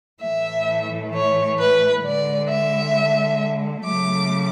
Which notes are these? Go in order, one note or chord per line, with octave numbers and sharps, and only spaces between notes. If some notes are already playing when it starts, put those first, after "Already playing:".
A2 E3 A3 E5
C#5
B4
D3 G#3 D5
E5
C#3 F#3 A3 D6